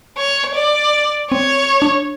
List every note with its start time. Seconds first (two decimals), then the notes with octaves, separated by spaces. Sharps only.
0.17 C#5
0.54 D5
1.30 C4 C#5
1.82 D4